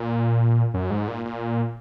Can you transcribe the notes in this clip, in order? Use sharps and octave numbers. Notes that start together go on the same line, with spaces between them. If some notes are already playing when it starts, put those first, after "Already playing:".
Already playing: A#2
F#2
G#2
A#2
A#2